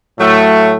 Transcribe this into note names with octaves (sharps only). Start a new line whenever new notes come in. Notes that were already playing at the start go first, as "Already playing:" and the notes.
A2 F#3 A3